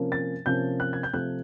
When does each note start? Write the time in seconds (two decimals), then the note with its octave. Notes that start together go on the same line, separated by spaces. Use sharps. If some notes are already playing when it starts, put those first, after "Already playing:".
Already playing: C3 F3 A#3 C#4
0.12 A6
0.46 C3 F3 A#3 C#4 G6
0.80 F#6
0.93 G#6
1.03 G6
1.13 C3 F3 A3 F#6